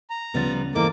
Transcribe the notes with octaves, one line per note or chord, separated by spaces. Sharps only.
A#5
D2 C#3 F3 G3 B3 A6
G#2 E3 A#3 A4 D6